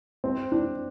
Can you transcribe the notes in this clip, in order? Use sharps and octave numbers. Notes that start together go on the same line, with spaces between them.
C4
D4